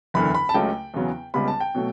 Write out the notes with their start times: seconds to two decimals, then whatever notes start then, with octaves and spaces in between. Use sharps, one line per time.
0.14 F#1 E2 D3 B5
0.35 B5
0.49 A5
0.54 C#2 C#3 F#3 A3 G5
0.94 E2 C#3 F#3 B3
1.34 C#2 C#3 G3 B3 B5
1.48 A5
1.60 G5
1.75 B2 F#3 A3